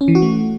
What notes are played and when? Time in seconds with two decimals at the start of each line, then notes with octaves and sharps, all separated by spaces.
0.01 C#4
0.08 E3
0.15 F#4
0.22 A3